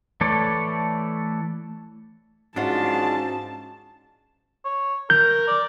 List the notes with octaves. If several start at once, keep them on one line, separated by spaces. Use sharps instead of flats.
E3 A3 A4 C#5 D5
G#2 C#4 D4 F4 F#4 F#5 A5
C#5
A#4 G6
D5